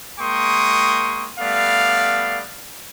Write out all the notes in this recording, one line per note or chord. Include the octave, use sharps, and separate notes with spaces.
G#3 A#3 G5 C6 C#6 D#6
G3 A3 B3 D5 F5